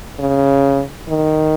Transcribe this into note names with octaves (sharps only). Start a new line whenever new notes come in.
C#3
D#3